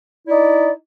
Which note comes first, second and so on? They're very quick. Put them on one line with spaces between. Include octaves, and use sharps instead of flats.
E4 D5 D#4